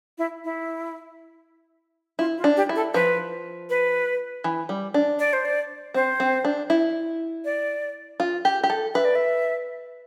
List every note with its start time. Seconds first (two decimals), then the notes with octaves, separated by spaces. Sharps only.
0.18 E4
0.44 E4
2.19 E4 F4
2.38 F4
2.44 D4
2.57 G4
2.69 E4
2.76 A4
2.94 F3 B4
3.70 B4
4.44 E3
4.69 G3
4.94 D4
5.19 D5
5.33 C5
5.45 D5
5.94 C4 C5
6.20 C4
6.45 D4
6.70 E4
7.45 D5
8.20 F4
8.45 G4
8.63 G4
8.70 A4
8.94 B4 E5
9.05 D5
9.15 E5